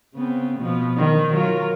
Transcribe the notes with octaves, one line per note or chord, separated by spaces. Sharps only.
C#3 B3 C4
B2 F3 B3
D#3
F#3 F4 A#4